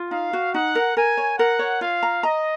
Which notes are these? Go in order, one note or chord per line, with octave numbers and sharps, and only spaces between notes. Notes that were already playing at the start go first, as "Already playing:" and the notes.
Already playing: F4
D#4 F5
F#4
D#4 F#5
A#4
A#4 G#5
C#5
A#4 F#5
C#5
F4 F5
A#5
D#5 A#5